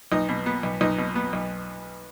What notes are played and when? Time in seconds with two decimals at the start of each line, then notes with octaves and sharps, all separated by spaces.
0.12 B1 D#4
0.29 B2
0.46 B3
0.63 B1
0.81 B1 D#4
0.98 B2
1.15 B3
1.33 B1